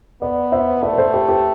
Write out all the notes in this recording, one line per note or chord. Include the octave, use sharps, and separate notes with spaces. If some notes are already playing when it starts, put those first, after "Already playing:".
B3 B4 D5
C5 E5
A3 B4 D5
B4
A4 C5
G4 B4
G4 B4